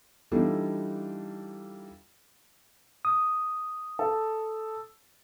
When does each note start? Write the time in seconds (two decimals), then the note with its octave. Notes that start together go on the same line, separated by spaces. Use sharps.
0.31 E3 G3 D4 D#4 F4 A4
3.05 D#6
3.99 A4